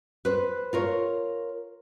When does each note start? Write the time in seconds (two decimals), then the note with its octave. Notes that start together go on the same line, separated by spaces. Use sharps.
0.25 B4 C5
0.73 F4 A#4 C#5